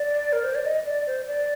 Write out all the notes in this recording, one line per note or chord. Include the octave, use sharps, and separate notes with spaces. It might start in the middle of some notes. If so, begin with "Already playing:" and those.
Already playing: D5
A#4
C5
D5
D#5
D5
C5
D5